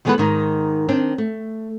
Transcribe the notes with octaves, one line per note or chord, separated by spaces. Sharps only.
D#3 E3 G#3 B3 A4 B4
G#2 D#3 D#4
D#3 C4 D4
A3